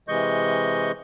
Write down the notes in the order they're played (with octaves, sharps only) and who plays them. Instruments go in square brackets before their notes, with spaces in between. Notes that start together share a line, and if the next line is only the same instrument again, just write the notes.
[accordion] C3 E3 G#3 D#5 C#6 G6